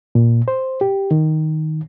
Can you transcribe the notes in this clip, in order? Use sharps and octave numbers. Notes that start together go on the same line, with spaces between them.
A#2
C5
G4
D#3